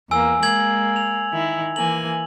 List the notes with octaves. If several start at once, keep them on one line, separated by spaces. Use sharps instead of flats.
E2 A#3 G#5 E6
G#3 A#3 G#6 F#7
F7
D#3 E4
E3 A#3 G#5 F#7